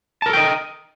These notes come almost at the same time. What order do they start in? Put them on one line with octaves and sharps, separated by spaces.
A5 A#4 A4 G5 D#5